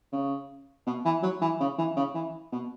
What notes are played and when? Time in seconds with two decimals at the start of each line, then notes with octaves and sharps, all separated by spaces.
0.13 C#3
0.87 B2
1.05 E3
1.23 F#3
1.42 E3
1.60 C#3
1.78 E3
1.96 C#3
2.15 E3
2.52 B2